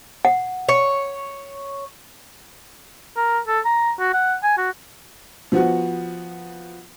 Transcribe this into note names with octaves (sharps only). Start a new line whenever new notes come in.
F#5
C#5
A#4
A4
A#5
F#4
F#5
G#5
F#4
F3 B3 F#4